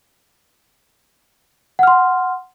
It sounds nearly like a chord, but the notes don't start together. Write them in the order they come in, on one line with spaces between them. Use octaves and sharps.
F#5 F6 C6